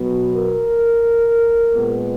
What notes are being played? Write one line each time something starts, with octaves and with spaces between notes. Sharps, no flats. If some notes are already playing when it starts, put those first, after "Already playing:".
Already playing: B2 F#3 B3
A#4
A#2 G#3 B3